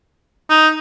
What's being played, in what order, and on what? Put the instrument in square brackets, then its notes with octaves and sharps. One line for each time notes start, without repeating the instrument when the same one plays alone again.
[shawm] D#4